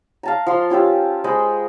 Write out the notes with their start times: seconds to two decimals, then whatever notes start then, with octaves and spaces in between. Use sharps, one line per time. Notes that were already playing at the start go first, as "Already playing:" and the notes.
0.23 F5 A5 A#5
0.46 F3 C6
0.70 C#4 F4 G4 E6
1.24 G#3 C5 D#5 B5